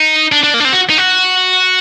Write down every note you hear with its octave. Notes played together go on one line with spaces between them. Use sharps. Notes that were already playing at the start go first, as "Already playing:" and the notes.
Already playing: D#4
D4
D4
A#3
D4
C4
F#4
D#4
F#4